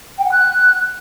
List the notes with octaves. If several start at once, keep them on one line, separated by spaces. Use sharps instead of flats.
G5
F#5
F#6